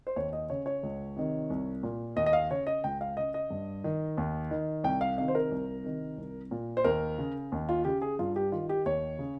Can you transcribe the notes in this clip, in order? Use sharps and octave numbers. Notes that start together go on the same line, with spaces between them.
C5
D#2 C#5
D#5
C#3 C#5
C#5
C#2
C3 D#3
C2
A#2
D#2 D#5
D#5
F5
C#3 C#5
D#5
C#2 G5
F5
C#3 D#5
D#5
G2
D#3
D#2
D#3
C2 G5
F5
C3 D#3 F5
C5
A#4
C2
C3 D#3
C2
A#2
C5
D#2 A#4
C#3
D#2
F4
C#3 G4
G#4
G2 F4
G4
D#3 F4
G4
D#2 C#5
C#3